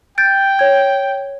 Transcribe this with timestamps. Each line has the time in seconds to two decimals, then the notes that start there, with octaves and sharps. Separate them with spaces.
0.18 G5 G6 A6 D7
0.59 C#5 G#6